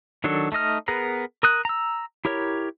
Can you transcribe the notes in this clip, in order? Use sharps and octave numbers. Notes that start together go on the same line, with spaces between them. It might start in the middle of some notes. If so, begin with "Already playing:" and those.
D#3 F#3 D4 A4 C#6
A3 D#4 D#5 F6
B3 G#4 A#4 B4 A#5
A#4 D#6 F#6
A#5 E6
E4 G4 A#4 C#5